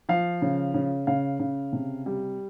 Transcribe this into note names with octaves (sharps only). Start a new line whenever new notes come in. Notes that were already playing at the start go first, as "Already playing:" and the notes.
F3 F5
C#3
C#3
C#3 F5
C#3
C3
G3